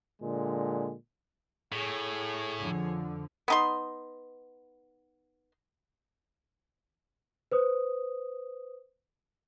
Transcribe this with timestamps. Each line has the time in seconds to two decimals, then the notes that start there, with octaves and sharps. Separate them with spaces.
0.22 A#2 D3 G#3
1.72 A2 G#4 C#5
2.59 F2 D3 F3
3.48 B3 D#4 C6
7.52 B4 C5 D#6